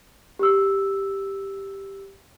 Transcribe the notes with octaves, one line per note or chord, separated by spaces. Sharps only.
G4 E6